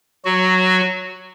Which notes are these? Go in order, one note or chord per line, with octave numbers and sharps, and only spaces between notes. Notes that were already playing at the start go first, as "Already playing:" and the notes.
F#3 F#4